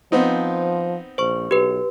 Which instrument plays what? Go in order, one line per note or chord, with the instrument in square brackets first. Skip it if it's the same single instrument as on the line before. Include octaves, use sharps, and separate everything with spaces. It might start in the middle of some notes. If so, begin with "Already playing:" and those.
[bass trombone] F3 [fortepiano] B3 C4 D#4
[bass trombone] A#1 [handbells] C5 C#6
[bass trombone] B1 [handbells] G4 B4